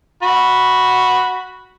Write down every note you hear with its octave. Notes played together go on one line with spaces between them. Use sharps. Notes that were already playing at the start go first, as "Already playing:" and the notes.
F#4 B5